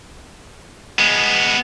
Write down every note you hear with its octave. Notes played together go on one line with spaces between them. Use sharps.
G#3 B3